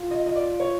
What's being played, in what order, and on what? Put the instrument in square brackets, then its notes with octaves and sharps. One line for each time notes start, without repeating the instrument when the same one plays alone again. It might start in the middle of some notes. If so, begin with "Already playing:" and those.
Already playing: [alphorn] F4
[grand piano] D#5
D#5
D5
C#5